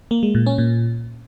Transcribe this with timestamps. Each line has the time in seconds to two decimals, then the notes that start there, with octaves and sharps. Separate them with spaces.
0.11 A#3
0.23 G#3
0.35 A#2
0.46 C#4
0.58 A#2